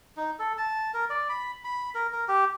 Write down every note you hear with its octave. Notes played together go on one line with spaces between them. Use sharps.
D#4
A4
A5
A#4
D5
B5
B5
A#4
A#4
G4